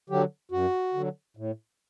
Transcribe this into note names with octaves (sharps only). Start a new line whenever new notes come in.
D3 F#3 G4
F#2 F#4
D3 F#3
A2